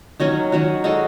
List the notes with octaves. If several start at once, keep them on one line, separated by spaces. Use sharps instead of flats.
D#3 F#3 C#4 F#4
D#3 F#3 C#4 F#4
G#3 D#4 F#4 A4